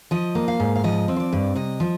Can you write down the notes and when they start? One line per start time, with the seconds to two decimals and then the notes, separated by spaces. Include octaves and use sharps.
0.11 F3 D#5
0.35 A#3
0.48 F5
0.60 G#2
0.75 F5
0.84 F3 D#5
1.08 C4
1.16 C5
1.20 D5
1.33 G2
1.55 C3 D#5
1.80 F3